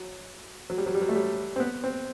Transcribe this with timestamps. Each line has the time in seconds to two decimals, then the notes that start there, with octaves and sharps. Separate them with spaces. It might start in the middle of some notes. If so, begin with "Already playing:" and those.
Already playing: F#3
0.70 F#3
0.78 G3
0.86 F#3
0.94 G3
1.01 F#3
1.09 A3
1.15 G3
1.56 C4
1.60 B3
1.84 C4